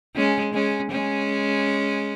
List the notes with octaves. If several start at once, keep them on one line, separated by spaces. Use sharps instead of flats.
G#3 C#4
G#3 C#4
G#3 C#4